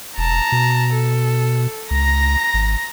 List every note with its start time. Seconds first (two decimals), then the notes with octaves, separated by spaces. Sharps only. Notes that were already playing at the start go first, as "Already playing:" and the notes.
0.18 E1 A5 A#5
0.52 B2
0.94 A4
1.91 C#2 A#5 A#6
2.54 G#1